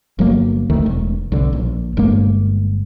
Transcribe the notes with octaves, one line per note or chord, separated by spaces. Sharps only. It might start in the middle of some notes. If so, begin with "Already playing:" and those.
G1 F#3 A#3
D2 D#3 A3
E1
B1 D3
A#1
G1 G2 G#3 A#3